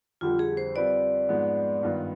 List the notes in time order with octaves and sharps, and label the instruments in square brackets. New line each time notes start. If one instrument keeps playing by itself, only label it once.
[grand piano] F2 D3 G3 [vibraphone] F4
[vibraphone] G#4
C5
[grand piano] G3 C4 F4 B4 [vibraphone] D5
[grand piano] G#2 F3 G#3 B3
G2 D#3 B3 F4